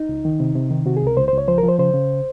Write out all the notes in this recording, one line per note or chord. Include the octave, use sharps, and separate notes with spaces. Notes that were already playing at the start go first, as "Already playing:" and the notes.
Already playing: D#4
C#2
D#3
C3
C3
D#3
C3 F#4
G#4
C#2 A#4
C#2 C5
C5
C#2
C#5
F3 C5
A#4
F3
C5
C#3 C5
C#3